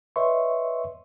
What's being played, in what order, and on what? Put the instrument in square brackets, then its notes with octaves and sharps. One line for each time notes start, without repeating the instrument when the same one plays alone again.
[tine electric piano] B4 C#5 D#5 E5 C6 C#6